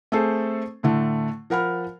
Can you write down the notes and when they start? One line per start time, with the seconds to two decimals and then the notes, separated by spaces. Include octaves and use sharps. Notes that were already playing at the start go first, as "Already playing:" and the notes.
0.12 A3 C4 G#4 A4 C5
0.83 A2 D3 A3
1.50 F3 A#4 F#5 B5 F6